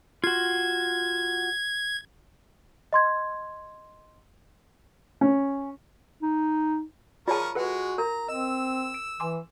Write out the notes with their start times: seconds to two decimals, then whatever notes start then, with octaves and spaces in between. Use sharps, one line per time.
0.24 F4 F#4 G#6
2.93 D#5 C6 G#6
5.21 C#4
6.22 D#4
7.28 F3 F4 G#4 A#4 C#5 D5 A5 C#6
7.55 G#3 F#4 A4 B4 F#5
7.98 A#4 A#5
8.29 C4 D#5 E6
8.94 D7
9.20 E3 G#5 C6 D6